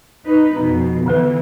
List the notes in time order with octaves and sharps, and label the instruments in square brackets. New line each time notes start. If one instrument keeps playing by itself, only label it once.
[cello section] D#4 B4
[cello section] F2 B2 [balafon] D#4
[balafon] D3 B3 B4 [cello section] E3